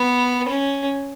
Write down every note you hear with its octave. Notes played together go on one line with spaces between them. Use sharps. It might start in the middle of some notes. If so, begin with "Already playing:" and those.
Already playing: B3
C#4